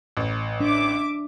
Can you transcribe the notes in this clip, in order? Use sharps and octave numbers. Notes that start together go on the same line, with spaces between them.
A1
D4 E5 D6